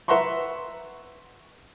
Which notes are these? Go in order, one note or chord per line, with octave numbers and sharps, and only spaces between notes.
B4 E5 F#5 A#5 C6 C#6